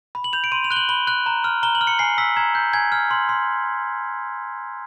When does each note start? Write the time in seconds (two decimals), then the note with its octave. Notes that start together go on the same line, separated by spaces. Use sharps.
0.15 B5
0.24 F#7
0.33 G6 F7
0.44 D7
0.52 C6 D#7
0.64 F7
0.71 F#6 G7
0.76 F#7
0.89 B5 G7
1.07 F#6
1.26 A#5
1.44 F6
1.63 A#5 G7
1.75 F#7
1.81 F6
1.87 C#7
1.99 G#5 C7
2.18 E6 B6
2.37 A#5 G#6
2.55 G6
2.73 G#5 G#6
2.92 F6
3.11 C6
3.29 C6